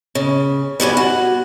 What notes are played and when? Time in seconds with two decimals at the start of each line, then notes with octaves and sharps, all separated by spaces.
0.15 C#3
0.80 G3 B3 F#4 G#5
0.97 F#4